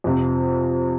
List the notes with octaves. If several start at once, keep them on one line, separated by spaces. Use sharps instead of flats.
F2 C3 F3